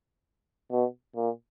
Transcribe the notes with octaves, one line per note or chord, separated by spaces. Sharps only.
B2
A#2